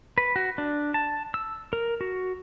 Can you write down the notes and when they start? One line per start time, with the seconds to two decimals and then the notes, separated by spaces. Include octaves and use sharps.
0.18 B4
0.36 F#4
0.58 D4
0.94 A5
1.34 E6
1.73 A#4
2.01 F#4